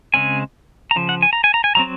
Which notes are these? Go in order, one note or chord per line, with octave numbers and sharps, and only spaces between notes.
C#3 G#3 C4 G#5
A#5
C#3 F3
F#5
G#5
A#5
G#5
A#5
G#5
F#3 C4 A#5